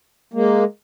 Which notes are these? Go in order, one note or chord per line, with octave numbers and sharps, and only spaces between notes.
G#3 A#3